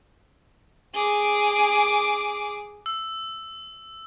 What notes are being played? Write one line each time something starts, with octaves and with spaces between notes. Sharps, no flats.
G#4 D6
E6